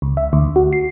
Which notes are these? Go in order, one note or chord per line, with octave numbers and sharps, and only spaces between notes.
C#2
E5
D2
F#4
C7